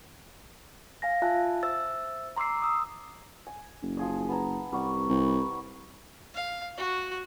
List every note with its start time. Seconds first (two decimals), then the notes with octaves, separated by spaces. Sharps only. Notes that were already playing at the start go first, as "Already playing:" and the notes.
1.02 F5 G#5 A#6
1.22 F4 E5 G#5 A5 F#6
1.63 C5 E5 E6 A6
2.36 A#5 C6 D6 E6 C7
2.62 D#6 E6
3.47 G#5
3.82 F#1
3.97 F3 G#4 D#5
4.29 B3 A5 A#5
4.72 C2 G3 F#5 C#6
5.09 C2
6.34 F5
6.77 F#4